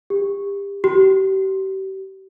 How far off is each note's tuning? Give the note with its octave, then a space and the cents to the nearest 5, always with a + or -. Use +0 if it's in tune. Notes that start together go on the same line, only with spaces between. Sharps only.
G4 +30
G4 -35